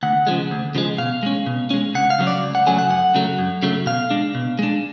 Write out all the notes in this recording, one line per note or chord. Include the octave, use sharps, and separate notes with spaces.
D2 F#5
C#3 F3 G#3
D2
C#3 F3 G#3
B2 F5
G#3 C#4
B2
G#3 C#4
C#2 F#5
F5
C#3 F#3 A3 C#4
D5
C#2
F#5
C#3 F#3 A3 C#4 G#5
F#5
F#2 F#5
C#3 F#3 A3
F#2
C#3 F#3 A3
B2 F5
G#3 D4
B2
G#3 D4